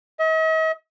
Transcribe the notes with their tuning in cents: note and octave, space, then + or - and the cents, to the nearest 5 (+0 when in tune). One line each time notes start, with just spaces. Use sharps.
D#5 +45